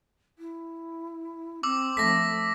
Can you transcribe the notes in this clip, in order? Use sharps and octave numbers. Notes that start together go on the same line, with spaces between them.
E4
C4 D6 E6
F3 A3 A#6 B6